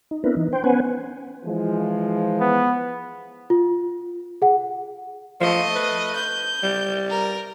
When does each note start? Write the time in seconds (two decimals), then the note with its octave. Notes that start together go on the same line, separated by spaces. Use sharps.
0.11 D#4
0.24 B3 C4 D4 E4 A#4 B4
0.36 E3 D#4
0.53 C5 G5
0.64 B3 C#4 B4 C5 F#5 G#5
1.45 E3 F3 G#3
2.41 B3
3.50 F4
4.42 G#4 F#5
5.41 F3 A3 D#5
5.76 B4
6.15 G6
6.63 G3
7.10 A#4